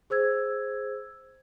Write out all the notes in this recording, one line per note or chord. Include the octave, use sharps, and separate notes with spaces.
G#4 C5 E6 G#6